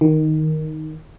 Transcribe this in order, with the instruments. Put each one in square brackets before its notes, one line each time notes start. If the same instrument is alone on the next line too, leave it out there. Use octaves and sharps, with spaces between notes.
[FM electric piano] D#3